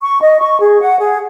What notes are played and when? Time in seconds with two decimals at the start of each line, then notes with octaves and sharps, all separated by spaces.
0.02 C#6
0.21 D#5
0.40 C#6
0.61 G#4
0.80 F#5
0.99 G#4